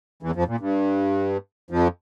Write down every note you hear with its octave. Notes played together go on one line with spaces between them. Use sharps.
E2 E3
F2 F3
A#2
G2
F2 F3